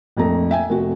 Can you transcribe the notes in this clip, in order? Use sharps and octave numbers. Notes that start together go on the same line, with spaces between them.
A#1 F2 A3 A#5
E5 G5 G#5
F1 F#4